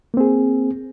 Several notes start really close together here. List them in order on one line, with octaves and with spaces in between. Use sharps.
A#3 C4 G#4